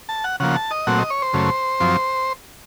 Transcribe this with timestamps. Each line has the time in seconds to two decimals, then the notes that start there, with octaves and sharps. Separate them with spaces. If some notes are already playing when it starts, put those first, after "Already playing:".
0.09 A5
0.24 F#5
0.40 C#3 F3 A#3 F#5
0.55 A5
0.71 D#5
0.87 A#2 F#3 A3 C4 F#5
0.98 D#5
1.10 C#5
1.22 C5
1.33 F#2 C#3 A3
1.80 F#2 F3 C4